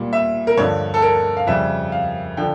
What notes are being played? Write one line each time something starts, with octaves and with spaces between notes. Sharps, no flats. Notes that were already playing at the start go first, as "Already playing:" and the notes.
Already playing: A#2 G3
E5
A#4
G2 D3 F3 C#5
A4
A#4
F5
F2 C#3 G3 E5
F5
D3 F3 G5